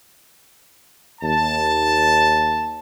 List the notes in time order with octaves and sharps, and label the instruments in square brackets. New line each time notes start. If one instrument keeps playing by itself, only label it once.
[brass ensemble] D#2 A5